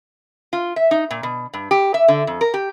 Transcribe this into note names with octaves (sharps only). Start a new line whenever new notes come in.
F4
E5
D#4
A#2
B2
G2
G4
E5
D3
F2
A#4
G4